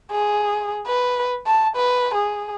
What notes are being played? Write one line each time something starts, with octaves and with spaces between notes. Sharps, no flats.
G#4
B4
A5
B4
G#4